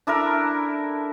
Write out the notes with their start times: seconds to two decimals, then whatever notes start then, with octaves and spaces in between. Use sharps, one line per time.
0.07 D4 E4 A4 A#4